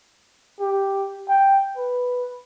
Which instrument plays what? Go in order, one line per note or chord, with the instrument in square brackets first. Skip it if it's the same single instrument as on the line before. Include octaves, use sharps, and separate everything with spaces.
[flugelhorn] G4
G5
B4